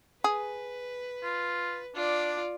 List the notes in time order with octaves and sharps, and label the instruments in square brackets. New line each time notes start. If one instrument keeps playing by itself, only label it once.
[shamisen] G#4 [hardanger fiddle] B4
[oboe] F4
[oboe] D4 [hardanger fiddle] F4 D5